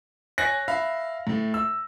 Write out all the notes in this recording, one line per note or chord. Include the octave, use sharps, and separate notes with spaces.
C#5 G#5 F#6 A#6
E5 F5 B5
A2 A3
E6